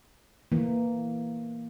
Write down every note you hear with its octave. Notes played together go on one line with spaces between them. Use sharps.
E3 A#3